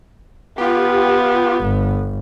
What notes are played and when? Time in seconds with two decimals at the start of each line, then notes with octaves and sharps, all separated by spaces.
0.58 B3 F4 G4
1.62 G1